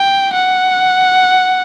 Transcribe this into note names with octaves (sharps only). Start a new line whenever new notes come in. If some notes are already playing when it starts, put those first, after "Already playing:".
Already playing: G5
F#5